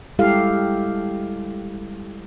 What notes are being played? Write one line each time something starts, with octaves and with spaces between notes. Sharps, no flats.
G3 G#3 E4 G4 A4 F5